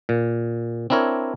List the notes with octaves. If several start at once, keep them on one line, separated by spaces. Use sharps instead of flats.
A#2
C4 D4 E4 A#4 C#5